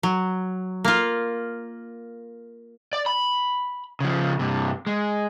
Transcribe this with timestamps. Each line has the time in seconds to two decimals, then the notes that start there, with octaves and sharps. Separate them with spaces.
0.03 F#3
0.85 A#3 F4
2.93 D5
3.06 B5
4.00 C#3 F3
4.39 G2 C3
4.87 G#3